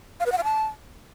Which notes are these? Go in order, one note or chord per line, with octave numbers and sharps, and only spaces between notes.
F5
B4
F#5
F5
A5